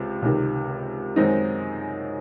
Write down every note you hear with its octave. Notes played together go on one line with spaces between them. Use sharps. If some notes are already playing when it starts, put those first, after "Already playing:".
Already playing: C#2 C3
C#2 C3 D#3
F#2 D#3 G#3 C4 D#4